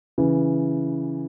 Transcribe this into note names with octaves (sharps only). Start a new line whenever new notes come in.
C#3 E3